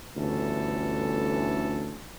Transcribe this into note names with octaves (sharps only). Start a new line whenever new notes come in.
G1 D2 E3 C#4 A4